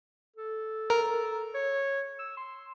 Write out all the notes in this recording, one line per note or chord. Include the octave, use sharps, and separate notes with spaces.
A4
A#4
C#5
E6
C6